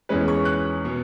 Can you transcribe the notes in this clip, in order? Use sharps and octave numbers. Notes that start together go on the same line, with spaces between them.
E2 E3 G#3 C#4 B4
C#6
F#6
B2 B3